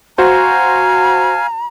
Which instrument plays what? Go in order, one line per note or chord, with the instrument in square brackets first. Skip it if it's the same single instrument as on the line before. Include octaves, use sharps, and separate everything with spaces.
[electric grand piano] F#4 C5 [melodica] F5 G#5 [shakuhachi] A#5